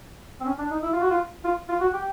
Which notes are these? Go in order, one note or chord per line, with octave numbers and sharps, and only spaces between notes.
C4
C#4
D4
D#4
E4
F4
F#4
F4
F4
F4
F#4
G4